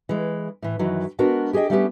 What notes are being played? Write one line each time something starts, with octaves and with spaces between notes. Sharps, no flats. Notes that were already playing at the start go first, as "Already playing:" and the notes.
E3 G#3
A2 E3
F#2 D#3 E3 F#3
G#3 B3 D4 F#4 A#4
G4 G#4 C5 D#5 G5
G3 A3 B3 C#4 D#4 G4